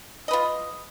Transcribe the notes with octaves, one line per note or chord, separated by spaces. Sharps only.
F4 B4 D#5